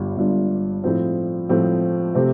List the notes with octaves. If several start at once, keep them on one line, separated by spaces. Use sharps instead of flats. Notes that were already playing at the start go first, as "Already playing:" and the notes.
Already playing: G1 G2 G3 F4
G1 G2 G3 F4
A2 F3 C4
A2 F3 C4
C3 A3 C4 G4